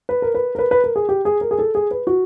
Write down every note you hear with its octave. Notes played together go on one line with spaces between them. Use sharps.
B4
A#4
B4
A#4
B4
B4
A#4
G#4
G4
G#4
A#4
G#4
A4
G#4
B4
F#4